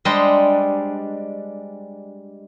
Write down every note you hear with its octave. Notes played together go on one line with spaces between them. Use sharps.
G3 G#3 D4 C5 D#5